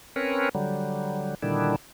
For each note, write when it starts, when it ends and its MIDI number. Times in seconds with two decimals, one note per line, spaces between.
0.16 0.49 60
0.16 0.49 61
0.16 0.49 70
0.16 0.49 71
0.16 0.49 73
0.55 1.35 50
0.55 1.35 54
0.55 1.35 55
1.43 1.76 46
1.43 1.76 50
1.43 1.76 51
1.43 1.76 55
1.43 1.76 62
1.43 1.76 64